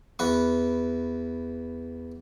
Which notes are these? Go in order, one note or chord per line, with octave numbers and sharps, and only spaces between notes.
E2 B4 C#6